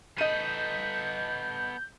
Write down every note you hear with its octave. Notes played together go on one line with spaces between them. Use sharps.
B3 A4 D#5 G6 D#7